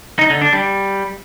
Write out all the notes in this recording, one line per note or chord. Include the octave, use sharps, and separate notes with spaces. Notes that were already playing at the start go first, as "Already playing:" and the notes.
D#4
D3
D4
G3